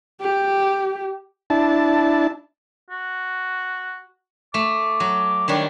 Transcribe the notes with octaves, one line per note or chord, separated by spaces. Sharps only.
G4
D4 E4 A5
F#4
A3 D6
F#3
D#3 G3 D4 C#5